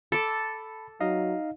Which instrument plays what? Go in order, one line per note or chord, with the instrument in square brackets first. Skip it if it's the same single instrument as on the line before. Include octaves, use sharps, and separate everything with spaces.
[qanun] A4 D6 [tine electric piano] A5 B5
[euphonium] F#3 [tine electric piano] D#4 D#5 F5